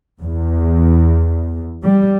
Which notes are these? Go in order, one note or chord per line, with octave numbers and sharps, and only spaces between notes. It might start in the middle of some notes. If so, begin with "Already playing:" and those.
E2
G3